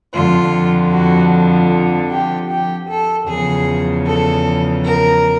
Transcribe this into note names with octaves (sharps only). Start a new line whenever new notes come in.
F2 D3 F3 F4
F#4
G4
G4
A4
E2 C#3 F3 G#4
A4
A#4